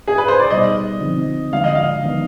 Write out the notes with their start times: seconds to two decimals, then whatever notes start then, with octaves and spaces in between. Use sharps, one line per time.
0.07 G#4
0.18 B4
0.28 C5
0.40 D5
0.49 B2 G3 B3 D#4 G#4 D#5
1.01 D3 F3 C4 D#4
1.52 D3 F3 G#3 F5
1.64 D#5
1.75 F5
2.03 D#3 B3 D#4